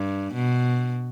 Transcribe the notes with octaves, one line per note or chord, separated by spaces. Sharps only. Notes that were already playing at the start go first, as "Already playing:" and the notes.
Already playing: G2
B2